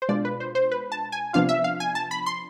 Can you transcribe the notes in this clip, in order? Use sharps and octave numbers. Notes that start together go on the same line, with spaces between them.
C5
B2 G#3 D4 F4 D5
B4
C5
C5
B4
A5
G#5
C3 F3 B3 D4 F4 F5
E5
F5
G#5
A5
B5
C6